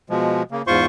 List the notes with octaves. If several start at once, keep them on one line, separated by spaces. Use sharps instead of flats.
B2 F3 G#3
C#3 A#3
E2 G#2 F4 C5 C6 C#6